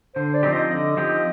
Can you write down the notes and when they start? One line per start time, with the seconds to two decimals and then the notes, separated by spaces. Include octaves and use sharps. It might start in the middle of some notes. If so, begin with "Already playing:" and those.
0.15 D3 C5
0.34 D5
0.43 F3 C4 D#4 G4
0.52 D#5
0.71 D3 D#5
0.97 F3 C4 D#4 G4